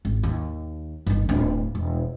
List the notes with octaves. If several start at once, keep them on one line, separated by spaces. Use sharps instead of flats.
G#1
D#2
G1 D#3
D1 D4
E1